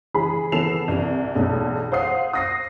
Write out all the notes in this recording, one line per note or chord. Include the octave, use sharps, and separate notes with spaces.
E3 G#4 B5
E3 B3 A4 C7 E7 F7
C2 C3
B1 E2
C5 F5 F#5 D#6 C7
D#6 A#6 C7